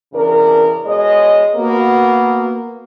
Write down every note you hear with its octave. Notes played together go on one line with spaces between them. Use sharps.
E2 C#3 D4 A#4
B2 G#3 C#5 D#5
A#3 B3 F#4